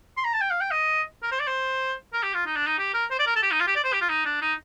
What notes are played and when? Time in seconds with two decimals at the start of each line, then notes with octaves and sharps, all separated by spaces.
0.17 C6
0.24 A#5
0.34 A5
0.41 G5
0.51 F5
0.61 G5
0.71 D#5
1.23 A#4
1.31 C5
1.40 D5
1.47 C5
2.13 A#4
2.23 G4
2.34 F4
2.46 D#4
2.56 D4
2.67 D#4
2.79 G4
2.94 A#4
3.11 C5
3.19 D5
3.26 A#4
3.36 A4
3.43 G4
3.51 D#4
3.60 F4
3.67 G4
3.76 D5
3.84 C5
3.93 G4
4.01 F4
4.09 D#4
4.25 D4
4.42 D#4